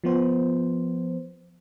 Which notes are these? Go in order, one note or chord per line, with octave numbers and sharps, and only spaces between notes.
F3 B3 C5